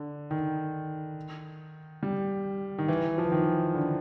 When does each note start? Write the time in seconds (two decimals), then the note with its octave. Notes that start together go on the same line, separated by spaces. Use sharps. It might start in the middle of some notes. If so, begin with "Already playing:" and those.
Already playing: D3
0.31 D#3
2.03 G3
2.78 D#3
2.88 E3
3.18 F3
3.25 E3
3.32 D#3
3.75 D3